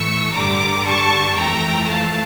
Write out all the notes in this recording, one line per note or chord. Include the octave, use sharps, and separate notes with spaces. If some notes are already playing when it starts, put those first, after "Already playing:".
Already playing: A2 E3 A3 C#6 E6
G2 D3 G3 A#5 D6
A5 C#6
F2 E3 A3 G5 A#5
F5 A5